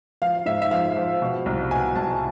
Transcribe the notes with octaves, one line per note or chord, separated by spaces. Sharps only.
F3 F5
G#2 E5
E5
F3 F5
F3
B2
C2
B2 G#5
C2 A5